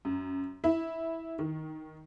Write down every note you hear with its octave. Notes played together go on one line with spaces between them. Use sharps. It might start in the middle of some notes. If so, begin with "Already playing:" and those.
F#2
E4
D#3